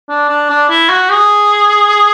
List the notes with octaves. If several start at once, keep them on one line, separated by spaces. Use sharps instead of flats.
D4
D4
D4
E4
F#4
G#4